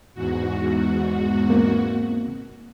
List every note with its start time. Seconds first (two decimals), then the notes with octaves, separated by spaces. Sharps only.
0.15 E2 G#2 F#4
1.50 A#3 C4